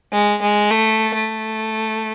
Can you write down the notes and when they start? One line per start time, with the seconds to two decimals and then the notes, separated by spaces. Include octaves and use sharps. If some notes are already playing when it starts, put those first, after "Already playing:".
0.12 G#3
0.42 G#3
0.71 A3
1.14 A3